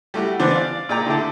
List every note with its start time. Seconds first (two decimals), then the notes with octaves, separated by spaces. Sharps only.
0.14 G3 A3 E4 F#4
0.39 E3 B3 D4 C5
0.51 D5 F5
0.89 A#2 G#4 D5 G5 A#5
1.07 D3 A3 E4 A4